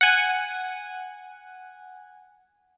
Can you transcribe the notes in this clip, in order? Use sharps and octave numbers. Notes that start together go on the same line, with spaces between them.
F#5 G#5